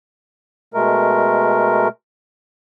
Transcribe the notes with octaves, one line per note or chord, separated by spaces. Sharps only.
B2 G#3 A3 A#4